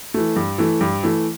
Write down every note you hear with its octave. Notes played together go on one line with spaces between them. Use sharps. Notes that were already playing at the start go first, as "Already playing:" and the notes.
E3 A3
G2
E3 A3
G2
E3 A3